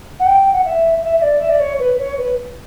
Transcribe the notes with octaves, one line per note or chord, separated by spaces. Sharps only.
F#5
G5
F#5
E5
E5
E5
D5
E5
D5
C#5
B4
C#5
B4